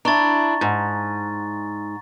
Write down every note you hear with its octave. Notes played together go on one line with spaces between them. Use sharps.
D4 E4 A#5 C#6 A6
G#2